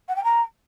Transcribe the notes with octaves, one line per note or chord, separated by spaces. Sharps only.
F#5
G5
A#5